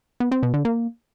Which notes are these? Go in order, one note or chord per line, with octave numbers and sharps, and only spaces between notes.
B3
C4
B2
D3
A#3